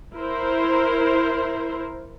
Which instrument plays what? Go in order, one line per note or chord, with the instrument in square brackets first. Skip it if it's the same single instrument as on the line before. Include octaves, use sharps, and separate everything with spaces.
[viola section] E4 A#4 C5